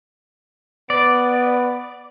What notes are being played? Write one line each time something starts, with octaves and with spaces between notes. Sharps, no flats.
B3 D5